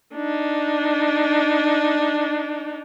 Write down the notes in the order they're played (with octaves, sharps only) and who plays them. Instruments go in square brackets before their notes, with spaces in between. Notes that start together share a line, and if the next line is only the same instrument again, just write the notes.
[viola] D4 D#4